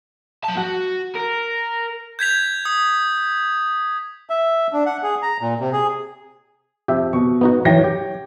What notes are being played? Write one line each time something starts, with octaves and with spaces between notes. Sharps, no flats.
F#3 A5
F#4 F#5
A#4
G6 G#6 B6 F7
D#6
E5
D4
F#5
G#4
A#5
A#2
C3
G#4
F2 G4 E5
B2 C#6
B3 D#4 F#4
E3 F#3 C#5 G5 A#6
G4